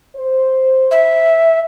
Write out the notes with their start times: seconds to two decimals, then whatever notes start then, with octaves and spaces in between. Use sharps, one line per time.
0.16 C5
0.91 E5